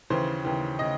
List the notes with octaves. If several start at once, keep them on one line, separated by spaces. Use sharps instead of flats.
D#2 C#3 E3 C5
D#2 C#3 E3
C#3 D#5